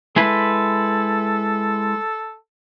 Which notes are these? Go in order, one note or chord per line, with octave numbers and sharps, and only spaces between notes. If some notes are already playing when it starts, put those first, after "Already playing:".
G#3 E4 A4 B4